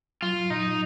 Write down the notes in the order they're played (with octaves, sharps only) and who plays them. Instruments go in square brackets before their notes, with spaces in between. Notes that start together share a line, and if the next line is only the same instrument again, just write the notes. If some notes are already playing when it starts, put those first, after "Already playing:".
[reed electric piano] F#3 [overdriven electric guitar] F4
[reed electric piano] A#2 [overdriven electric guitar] D#4